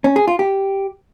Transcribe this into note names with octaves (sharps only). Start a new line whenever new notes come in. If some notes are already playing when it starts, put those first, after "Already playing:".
C#4
G#4
F4
G4